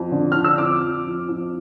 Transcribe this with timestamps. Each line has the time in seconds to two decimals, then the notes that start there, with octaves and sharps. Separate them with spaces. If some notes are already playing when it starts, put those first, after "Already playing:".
Already playing: F2
0.11 D3
0.32 F2 F6
0.45 E6
0.58 F2 D6
0.81 F2
1.05 F2
1.29 F2